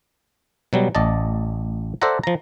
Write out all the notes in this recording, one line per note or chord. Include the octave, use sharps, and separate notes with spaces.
B2 F#3 G3
A1 D5 D#5 A5
A4 C5 D5 E5 F#5 A#5
F3 A#5